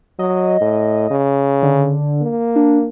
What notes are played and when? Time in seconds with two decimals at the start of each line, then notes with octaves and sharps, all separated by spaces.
0.19 F#3 D#5
0.61 A2
1.11 C#3
1.63 D3
2.22 A#3
2.56 D4